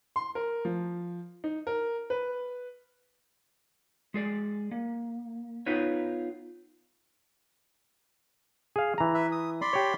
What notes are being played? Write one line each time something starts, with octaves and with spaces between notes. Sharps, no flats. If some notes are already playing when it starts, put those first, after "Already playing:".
C6
A#4
F3
D#4
A#4
B4
G#3 G#4 D5
A#3
B3 D#4 F4 B4 C#5
G#4 F5
E3 A#5
B4 E5
D#6
D5 B5 C6
G4 C#5